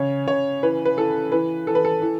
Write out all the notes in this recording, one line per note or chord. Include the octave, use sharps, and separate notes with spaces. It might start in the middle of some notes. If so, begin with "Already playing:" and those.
Already playing: C#3 C#5
C#3 C#5
E3 B4
B4
E3 A4
E3 B4
E3 A4
B4
A4
E3